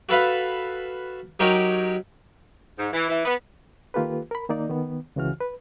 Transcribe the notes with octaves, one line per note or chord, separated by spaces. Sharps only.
F#4 A4 B4 F5
F#3 D#4 G4 A#4 C#5
G#2
E3
E3
B3
D#3 A#3 F4 G4 A4 B4
A#4 B5
D#3 A#3 D#4 D5
D#3 B3
C#2 C#3 E3 F#4 F6
B4